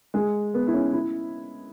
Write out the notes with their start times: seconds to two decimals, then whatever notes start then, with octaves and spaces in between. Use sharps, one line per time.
0.14 G#3
0.54 B3
0.67 E4
0.74 C#4
0.93 E4